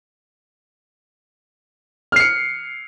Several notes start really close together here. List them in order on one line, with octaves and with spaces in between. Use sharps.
F6 C7 C#7